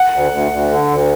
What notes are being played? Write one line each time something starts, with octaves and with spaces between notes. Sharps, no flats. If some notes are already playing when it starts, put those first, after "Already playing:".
Already playing: F#5
D2
D2
D2
D3
D2